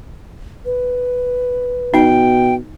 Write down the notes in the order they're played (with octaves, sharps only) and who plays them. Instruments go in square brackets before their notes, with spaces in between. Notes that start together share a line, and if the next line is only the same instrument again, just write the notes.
[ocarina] B4
[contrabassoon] B2 [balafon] D#4 [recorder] G5